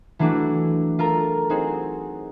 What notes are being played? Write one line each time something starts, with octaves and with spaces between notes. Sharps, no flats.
E3 F#3 A3 D4 E4 F#4
F4 A4 A#4 A#5
C4 D#4 F#4 G#4